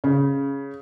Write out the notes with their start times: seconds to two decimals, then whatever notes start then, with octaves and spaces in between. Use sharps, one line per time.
0.04 C#3